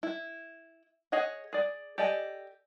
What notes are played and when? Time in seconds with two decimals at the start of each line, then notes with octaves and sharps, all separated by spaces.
0.03 E4
1.12 G#4 C#5 D#5 F#5
1.53 G#4 D5
1.98 G4 A4 D5 D#5 G#5